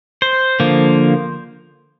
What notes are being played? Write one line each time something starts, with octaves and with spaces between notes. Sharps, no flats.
C5
D3 F3 A#3